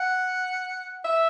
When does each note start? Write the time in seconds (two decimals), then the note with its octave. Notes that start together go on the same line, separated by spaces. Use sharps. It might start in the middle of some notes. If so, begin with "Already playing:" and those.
Already playing: F#5
1.05 E5